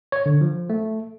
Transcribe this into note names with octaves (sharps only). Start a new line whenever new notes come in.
C#5
D3
F3
A3